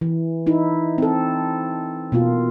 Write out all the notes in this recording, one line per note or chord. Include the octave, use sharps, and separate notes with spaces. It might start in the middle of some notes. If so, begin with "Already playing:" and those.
E3
D#4 E4
C4 A4
B2 A#3 F4